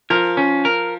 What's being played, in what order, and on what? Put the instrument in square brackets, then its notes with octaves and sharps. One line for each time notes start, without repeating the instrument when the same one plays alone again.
[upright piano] F3 [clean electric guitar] A#4
[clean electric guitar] C#4
A#4